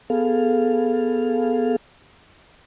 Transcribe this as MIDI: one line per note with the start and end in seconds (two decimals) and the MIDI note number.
0.10 1.76 59
0.10 1.76 68
0.10 1.76 69
0.10 1.76 77